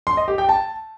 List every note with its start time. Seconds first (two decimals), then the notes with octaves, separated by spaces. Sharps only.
0.07 C6
0.17 D#5
0.28 G4
0.38 G5
0.49 A5